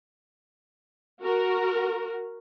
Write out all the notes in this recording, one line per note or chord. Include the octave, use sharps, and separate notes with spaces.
F#4 A#4